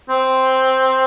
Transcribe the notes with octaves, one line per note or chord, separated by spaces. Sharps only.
C4